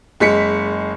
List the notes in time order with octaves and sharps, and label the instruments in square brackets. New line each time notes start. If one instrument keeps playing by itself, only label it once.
[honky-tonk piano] F#1 G#3 B6 C#7